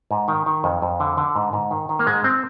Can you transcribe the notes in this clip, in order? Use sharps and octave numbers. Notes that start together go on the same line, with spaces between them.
G#2
D#3
D#3
F2
F2
D3
D3
G#2
G#2
D#3
D#3
A#3
G#2 G#3
C4